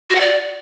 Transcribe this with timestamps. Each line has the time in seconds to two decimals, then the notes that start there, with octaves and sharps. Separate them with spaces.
0.10 F#4
0.15 F#5
0.20 D5